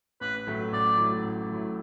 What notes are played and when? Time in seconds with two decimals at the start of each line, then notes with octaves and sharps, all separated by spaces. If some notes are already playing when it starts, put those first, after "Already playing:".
0.21 A1 B4
0.47 A2 F#3 A3 E4
0.72 A1 D5
0.98 A2 F#3 A3 E4
1.24 A1
1.50 A2 F#3 A3 E4